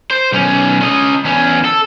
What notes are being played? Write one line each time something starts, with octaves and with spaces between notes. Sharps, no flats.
C5
B1 C#4
C#4 D#5
E2 C#4
A4